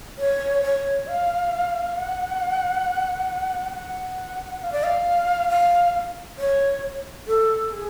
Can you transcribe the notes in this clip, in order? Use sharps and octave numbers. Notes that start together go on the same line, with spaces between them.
C#5
C#5
F5
F#5
F#5
F5
D5
F5
F5
C#5
A4
G#4